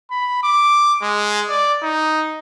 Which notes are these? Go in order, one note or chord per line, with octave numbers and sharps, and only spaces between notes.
B5
D6
G#3
D5
D#4